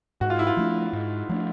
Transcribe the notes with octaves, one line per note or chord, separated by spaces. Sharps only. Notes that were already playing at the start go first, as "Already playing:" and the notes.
G#2 F#4
F4
E4
F4
F3 A3 D4
G#2
F3 A3 D4